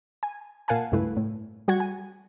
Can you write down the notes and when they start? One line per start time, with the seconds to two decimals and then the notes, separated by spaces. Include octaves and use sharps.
0.23 G#5
0.68 A#2 A#4 F5 F#5 G#5 A5
0.92 C#2 G2 A3 E4 B4
1.17 A2
1.68 G3 F#4 F#5 G#6
1.80 G#5